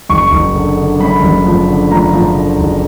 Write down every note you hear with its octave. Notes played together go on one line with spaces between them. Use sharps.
F#1 C#6
F#1
D3
D3
F#2 B5
F#1
F3
D3
F3 A#5
F3
D3
F#1